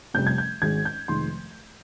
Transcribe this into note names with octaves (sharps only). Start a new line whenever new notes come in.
F1 F2 C3 G3 G6
G#6
G6
G#1 G#2 D#3 G#3 G#6
G6
F1 F2 D#3 G#3 C6